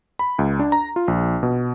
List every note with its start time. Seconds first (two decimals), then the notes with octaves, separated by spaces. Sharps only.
0.19 B5
0.39 C#2
0.59 D4
0.72 A#5
0.96 F4
1.08 A#1
1.43 B2